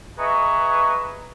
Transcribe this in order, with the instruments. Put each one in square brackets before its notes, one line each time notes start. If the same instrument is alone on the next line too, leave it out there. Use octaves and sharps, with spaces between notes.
[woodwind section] G#4 B4 D#5 E5 A#5 C#6